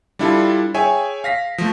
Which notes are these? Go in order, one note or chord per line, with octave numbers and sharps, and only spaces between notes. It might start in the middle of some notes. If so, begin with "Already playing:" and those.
G3 D4 E4 F4 A4
G#4 C#5 E5 G5 G#5
F5 A#6 B6
F3 A3